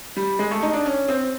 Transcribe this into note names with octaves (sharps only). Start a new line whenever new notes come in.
G3
G#3
A3
D#4
D4
C#4
C4